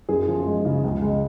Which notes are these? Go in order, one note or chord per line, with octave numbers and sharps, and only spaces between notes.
F#2 G#4
F3
G#3
C#3
C#2
G#3